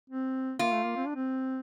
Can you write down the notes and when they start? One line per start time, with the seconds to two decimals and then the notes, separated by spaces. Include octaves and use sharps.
0.10 C4
0.59 A#3 F4
0.72 A3
0.84 A#3
0.96 C4
1.07 D4
1.16 C4